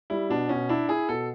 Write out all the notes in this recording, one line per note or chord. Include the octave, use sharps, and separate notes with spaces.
G3 E4
B2 D4
B2 C#4
D4 E4
E4 G#4
B2 A4